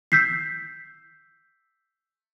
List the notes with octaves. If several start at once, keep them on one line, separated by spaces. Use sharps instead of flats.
E6 G6 B6 C7